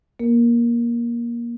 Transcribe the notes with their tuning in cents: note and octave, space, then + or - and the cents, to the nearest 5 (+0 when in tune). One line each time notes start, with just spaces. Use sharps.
A#3 +20 A#4 +0